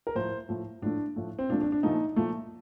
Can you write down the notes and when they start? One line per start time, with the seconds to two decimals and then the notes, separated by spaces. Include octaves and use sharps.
0.07 A#4
0.15 A2 F3 A3 C5
0.49 A2 F3 A3
0.82 A2 F3 A3 D4
1.16 A2 F3 A3
1.39 C4
1.49 A#2 F3 A3 D4
1.61 D4
1.72 D4
1.83 A#2 F3 A3 D#4
2.16 A#2 F3 A3